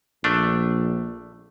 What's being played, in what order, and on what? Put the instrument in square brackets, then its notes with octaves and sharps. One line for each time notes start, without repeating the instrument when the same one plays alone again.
[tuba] A#1 [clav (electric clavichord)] A3 D4